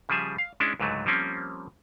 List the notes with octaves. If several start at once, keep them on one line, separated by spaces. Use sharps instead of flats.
C#3 F3 G3 G#4 E5
F5
G#3 C#4 D4 E4
C#2 G#2 D3 F#3 A3
F3 G3 A#3 C4 C#4